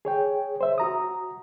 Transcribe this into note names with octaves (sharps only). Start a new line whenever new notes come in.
G#4 C#5 G5
C5 E5
F#4 A#5 D#6